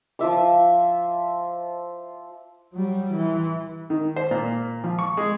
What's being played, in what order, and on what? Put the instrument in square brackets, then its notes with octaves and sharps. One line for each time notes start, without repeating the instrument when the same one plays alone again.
[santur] F3 F4 E5 D6
[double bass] F#3 G3
E3
[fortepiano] D#3
C5
A#2
F3
C#6
G#3